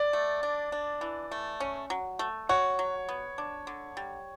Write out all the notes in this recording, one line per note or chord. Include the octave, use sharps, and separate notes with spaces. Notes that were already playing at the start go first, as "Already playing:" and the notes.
Already playing: D5
A3
D4
D4
E3
A3
C#4
F#3
A3
F#4 C#5
F#3
B3
D4
D3
G3